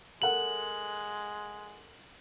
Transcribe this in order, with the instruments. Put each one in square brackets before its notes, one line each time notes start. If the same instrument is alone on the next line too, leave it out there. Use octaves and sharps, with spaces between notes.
[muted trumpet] G#3 [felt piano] A4 A#4 F#5 [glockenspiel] F#7